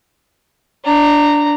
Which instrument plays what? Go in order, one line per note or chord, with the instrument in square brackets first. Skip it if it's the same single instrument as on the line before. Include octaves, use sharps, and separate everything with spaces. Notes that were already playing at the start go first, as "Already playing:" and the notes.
[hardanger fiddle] D4 A#5